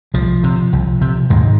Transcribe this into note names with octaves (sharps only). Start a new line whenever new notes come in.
C2 F3
C3
C2
C3
D#2 G#2 G#3